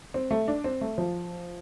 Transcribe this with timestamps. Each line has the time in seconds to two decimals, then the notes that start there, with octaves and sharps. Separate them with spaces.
0.14 C4
0.31 A3
0.48 D4
0.64 C4
0.81 A3
0.98 F3